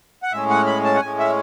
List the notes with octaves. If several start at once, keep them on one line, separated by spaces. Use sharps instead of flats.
F#5
A2 G#3 C#4 E5
F#5
B5
A5
F#5
A2 G#3 C#4 G#5
E5